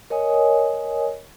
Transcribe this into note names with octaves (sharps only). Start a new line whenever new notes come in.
A#4 C#5 D#5 G#5 D#6